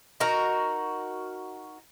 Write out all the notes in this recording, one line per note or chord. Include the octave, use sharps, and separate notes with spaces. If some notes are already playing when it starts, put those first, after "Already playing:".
D#4 F#4 A#4